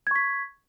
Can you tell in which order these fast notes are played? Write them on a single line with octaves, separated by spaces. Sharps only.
G#6 C#6 B6